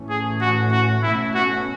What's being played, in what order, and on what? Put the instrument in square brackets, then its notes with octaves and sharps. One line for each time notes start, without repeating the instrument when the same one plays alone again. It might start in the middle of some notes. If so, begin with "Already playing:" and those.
Already playing: [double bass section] A2 E3 A3 C#4
[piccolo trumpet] G#4
F#4
F#4
[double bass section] B2 A3 C#4 [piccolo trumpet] E4
[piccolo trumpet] F#4